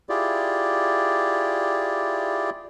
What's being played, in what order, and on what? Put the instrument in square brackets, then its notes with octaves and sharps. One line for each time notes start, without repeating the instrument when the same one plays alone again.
[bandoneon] E4 F4 G4 G#4 D5